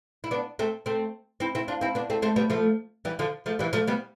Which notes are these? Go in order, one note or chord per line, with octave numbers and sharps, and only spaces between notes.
E4
B3 D4
A3 C4
A3 C4
C4 E4
C4 E4
D4 F4
C4 E4
B3 D4
A3 C4
A3 C4
G3 B3
F3 A3
E3 G3
D3 F3
F3 A3
E3 G3
F3 A3
G3 B3